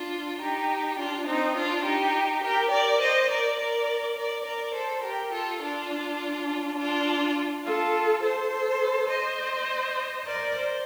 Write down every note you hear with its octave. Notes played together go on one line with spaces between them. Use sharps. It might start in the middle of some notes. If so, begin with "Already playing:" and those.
Already playing: D4 F4
D#4 G4
D4 F4
C4 D#4
D4 F4
D#4 G4
G4 A#4
A#4 D5
C5 D#5
A#4 D5
A#4 D5
A#4 D5
A#4 D5
A4 C5
G4 A#4
F4 A4
D4 F4
D4 F4
F4 A4
A4 C5
C5 D#5
A#4 D5
C5